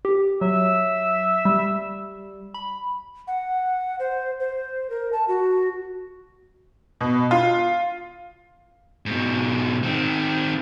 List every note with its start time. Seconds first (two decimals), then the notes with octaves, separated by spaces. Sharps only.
0.05 G4
0.41 F#3 E5
1.45 G3
2.54 B5
3.27 F#5
4.00 C5
4.40 C5
4.90 A#4
5.13 A5
5.28 F#4
7.01 B2
7.31 F4
9.06 G#2 B2
9.83 D#3 C4